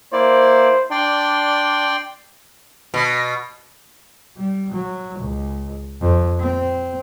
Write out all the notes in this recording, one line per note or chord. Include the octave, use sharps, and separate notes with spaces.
A#3 E4 C5 D5
D4 D5 G5 C6
B2
G3
F#3
C#2
F2
C4